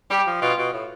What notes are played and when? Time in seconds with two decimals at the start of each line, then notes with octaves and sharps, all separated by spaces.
0.10 G3 G4
0.27 F3
0.41 B2 F4
0.58 B2
0.73 A2